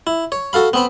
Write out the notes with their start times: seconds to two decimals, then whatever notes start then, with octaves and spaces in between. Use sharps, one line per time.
0.07 E4
0.32 C#5
0.53 F#4 A4 F5 B5
0.73 B3 C4 B5